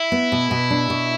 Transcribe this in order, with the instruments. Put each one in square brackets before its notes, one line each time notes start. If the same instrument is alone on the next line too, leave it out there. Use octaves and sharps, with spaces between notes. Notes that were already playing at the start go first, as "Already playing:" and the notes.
Already playing: [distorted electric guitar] E4
[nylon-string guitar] B3
B2
B2
D4
B2